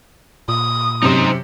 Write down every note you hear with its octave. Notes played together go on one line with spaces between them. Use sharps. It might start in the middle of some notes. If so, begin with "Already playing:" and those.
A#2 D#6
F#2 C3 D#4 C5